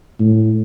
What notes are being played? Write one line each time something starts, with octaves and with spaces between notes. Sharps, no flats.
A2